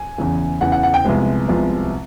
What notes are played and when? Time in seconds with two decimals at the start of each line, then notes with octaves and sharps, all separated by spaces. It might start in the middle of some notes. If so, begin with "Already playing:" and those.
Already playing: G#5
0.18 E2 C#3 E3
0.61 E2 C#3 E3 F#5
0.72 F#5
0.83 F#5
0.94 G5
1.05 C2 C3 F3 G#3 B3
1.48 C2 C3 F3 G#3 B3